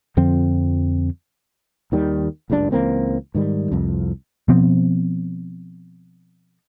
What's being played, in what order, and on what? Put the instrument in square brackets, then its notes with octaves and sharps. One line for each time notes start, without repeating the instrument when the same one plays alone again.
[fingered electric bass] F2 D3 F3 C4
[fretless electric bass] D#2 D#3 G3
F#1 C#2 G2 D4
C#2 E3 A#3 C4
G#2 D#3 G3
C2 F2
[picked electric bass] B2 F3 B3 C4